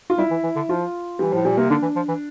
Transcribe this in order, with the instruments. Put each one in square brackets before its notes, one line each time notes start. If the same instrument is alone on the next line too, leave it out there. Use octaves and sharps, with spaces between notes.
[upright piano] F4
[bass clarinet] G3 [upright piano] E4
[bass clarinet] E3
E3
D3
[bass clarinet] F3 [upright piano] F4
[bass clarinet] E3 [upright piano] G3
[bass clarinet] A2 [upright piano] F3
[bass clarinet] A#2 [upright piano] G3
[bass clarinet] C3 [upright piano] A#3
[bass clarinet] D3 [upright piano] D4
[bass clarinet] E3
F3
E3